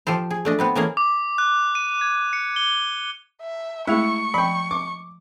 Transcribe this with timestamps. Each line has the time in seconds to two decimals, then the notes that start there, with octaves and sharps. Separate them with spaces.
0.07 F3 G4 A4 C5
0.30 G#4
0.45 A3 D4 D#5
0.59 B3 C4 B4
0.75 E3 A3 A#3 C#4 G#4 A#4
0.97 D6
1.38 F#6
1.75 D#7
2.01 G#6
2.33 C#7
2.56 G7
3.41 E5
3.87 G#3 A3 E4 G#4 C#6
4.34 F3 G5 B5
4.71 D6